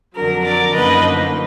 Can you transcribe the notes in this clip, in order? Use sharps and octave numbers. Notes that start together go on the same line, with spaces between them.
F2 D3 F#3 A#4
A#4 D5
F#2 D3 F3 A#3 D#4 B4 D#5